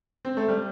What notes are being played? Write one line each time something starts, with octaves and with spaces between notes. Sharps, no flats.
C4
A3
G3